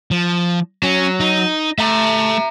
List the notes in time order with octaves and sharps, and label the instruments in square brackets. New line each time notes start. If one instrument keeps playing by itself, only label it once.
[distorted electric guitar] F3
[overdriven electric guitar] F#3 [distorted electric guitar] C#4
[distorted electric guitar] D#4
[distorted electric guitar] A3 [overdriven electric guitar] E5 A#5